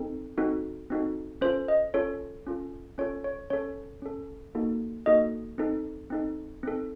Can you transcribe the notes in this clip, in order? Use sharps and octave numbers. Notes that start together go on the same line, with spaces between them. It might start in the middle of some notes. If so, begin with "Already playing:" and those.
Already playing: C4 D#4 A4
C4 D#4 F#4 A4
C4 D#4 F#4 A4
C#4 F4 A4 C5
D#5
C#4 F4 A4 C#5
C#4 F4 A4
C#4 F4 A4 C#5
C#5
C#4 A4 C#5
C#4 A4
A#3 D#4 F#4 A4
A#3 D#4 F#4 A4 D#5
C4 D#4 A4
C4 D#4 A4
C4 D#4 A4